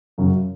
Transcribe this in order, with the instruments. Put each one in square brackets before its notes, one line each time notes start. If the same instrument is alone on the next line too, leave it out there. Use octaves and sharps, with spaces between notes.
[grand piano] F#2 C#3 F#3 C#4